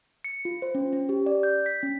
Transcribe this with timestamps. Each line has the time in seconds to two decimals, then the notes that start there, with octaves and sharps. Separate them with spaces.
0.24 C#7
0.45 F4
0.62 C5
0.75 C#4
0.93 C#4
1.09 G4
1.26 D5
1.43 G6
1.66 B6
1.83 C#4